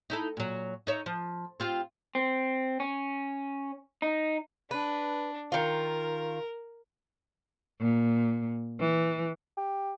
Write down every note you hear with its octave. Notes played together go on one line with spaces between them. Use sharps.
D#4 E4 A4
A#2 F#3
D#4 C#5 E5
F3
C4 F4 G4
C4
C#4
D#4
D4 B4
D#3 F4 A#4
A#2
E3
G4